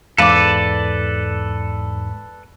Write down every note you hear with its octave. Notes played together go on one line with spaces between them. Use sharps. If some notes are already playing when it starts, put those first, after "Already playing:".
E2 G#2 A4 B4 D5 F5 D6